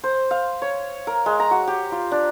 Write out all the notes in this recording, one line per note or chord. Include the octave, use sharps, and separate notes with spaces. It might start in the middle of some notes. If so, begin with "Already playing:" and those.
C5
F5
C#5
A#4
G#3
A#5
F#4
G4
F4
D4